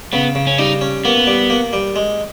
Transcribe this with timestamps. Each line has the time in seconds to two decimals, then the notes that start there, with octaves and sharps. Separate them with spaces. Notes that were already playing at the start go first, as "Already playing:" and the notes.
0.13 C#3 B3
0.35 C#3
0.47 C#4
0.58 G3 D#4
0.81 C#4
1.05 A#3 B3
1.27 G3
1.50 A#3
1.73 G3
1.96 G#3